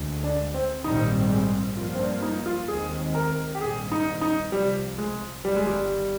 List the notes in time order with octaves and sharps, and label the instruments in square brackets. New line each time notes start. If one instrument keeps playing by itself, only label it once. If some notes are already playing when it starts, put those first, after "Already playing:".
Already playing: [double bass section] D2 D3 G#3
[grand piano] D4
C4
[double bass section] A#1 G#2 D#3 G3 C4 [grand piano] D#4
[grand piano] G#3
[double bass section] G2 F3 A#3 [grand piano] F4
[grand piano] C4
D4
D#4
F4
[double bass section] D#2 D#3 G#3 C4 [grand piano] G#4
[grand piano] A#4
G4
[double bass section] A#1 G#2 D#3 G3 C4 [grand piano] G#4
[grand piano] D#4
D#4
[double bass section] C2 C3 F3 [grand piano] G3
[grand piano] G#3
[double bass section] G1 G2 D#3 [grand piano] G3
[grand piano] G#3
G3